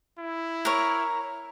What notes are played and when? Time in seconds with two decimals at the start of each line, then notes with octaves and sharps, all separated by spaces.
0.19 E4
0.65 A#4 C#5